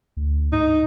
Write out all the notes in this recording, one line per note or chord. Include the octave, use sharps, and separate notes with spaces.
D2
G#2 D#4